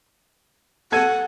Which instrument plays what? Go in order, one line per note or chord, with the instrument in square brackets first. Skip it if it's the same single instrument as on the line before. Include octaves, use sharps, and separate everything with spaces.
[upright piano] A4 G#6 D#7 [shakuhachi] F#5